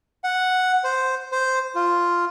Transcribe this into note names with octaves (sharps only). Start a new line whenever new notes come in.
F#5
C5
C5
F4